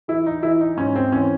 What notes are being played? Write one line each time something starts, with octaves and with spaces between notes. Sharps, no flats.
E3 E4
D#4
E3 E4
D#4
G#2 C#4
C4
E3 C#4